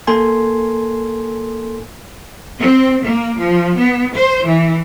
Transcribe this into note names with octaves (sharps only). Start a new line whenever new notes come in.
A#3 A4 A#4 G#5 C6
C4
A#3
F3
B3
C5
E3